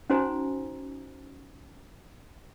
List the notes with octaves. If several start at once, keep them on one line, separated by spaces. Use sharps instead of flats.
C#4 D#4 F#4 C5 G#5 A#5